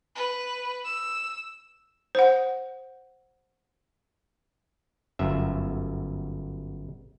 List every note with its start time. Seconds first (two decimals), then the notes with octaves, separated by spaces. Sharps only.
0.16 B4
0.85 E6
2.15 C5 F#5
5.19 G1 F#2 E5